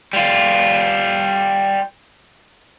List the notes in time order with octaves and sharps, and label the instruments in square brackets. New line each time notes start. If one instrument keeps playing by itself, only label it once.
[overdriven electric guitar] G3 F4